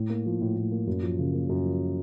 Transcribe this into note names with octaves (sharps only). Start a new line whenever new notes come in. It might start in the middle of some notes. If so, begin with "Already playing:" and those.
Already playing: A2
A#3
F3
A2
A2
A#3
F#2
F3
C#3
A#3
F#2
F3